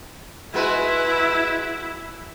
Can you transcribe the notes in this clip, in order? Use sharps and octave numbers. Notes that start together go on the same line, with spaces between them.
G#3 E4 F#4 B4